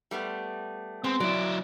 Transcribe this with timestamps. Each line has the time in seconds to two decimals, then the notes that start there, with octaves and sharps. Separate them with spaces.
0.11 G3 A3 B3
1.04 G#3 B3 C4
1.20 F#3 E4 D5